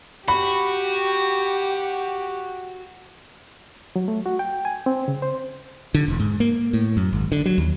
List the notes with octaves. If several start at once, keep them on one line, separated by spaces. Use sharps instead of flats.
F#4 G4 B5
F#3
A3
F#4
G5
G#5
C4
C#3
C5
D3
E1
G#2
A#3
A2
F#2
G#1
D3
F#3
D#2